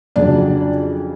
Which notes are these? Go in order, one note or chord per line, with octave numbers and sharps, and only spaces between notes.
F2 C#3 F#3 D4 D5